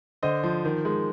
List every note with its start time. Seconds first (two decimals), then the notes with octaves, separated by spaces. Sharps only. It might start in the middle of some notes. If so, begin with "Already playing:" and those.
0.23 D3 C5 D#5
0.44 F3
0.65 D#3
0.85 G#3